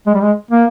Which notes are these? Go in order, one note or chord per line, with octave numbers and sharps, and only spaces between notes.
G#3
G3
G#3
A#3